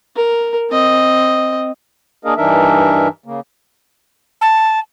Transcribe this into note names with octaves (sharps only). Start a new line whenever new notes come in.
A#4
C4 D#5
A#3 D4 G#4 A#4 D#5 F5
G2 E3 D4 D#4 A#4 E5
C#3 A#3
A5